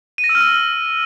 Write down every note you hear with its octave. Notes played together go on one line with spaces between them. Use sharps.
D#7
A#6
E6
F6
E6